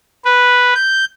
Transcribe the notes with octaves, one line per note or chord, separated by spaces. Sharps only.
B4
G6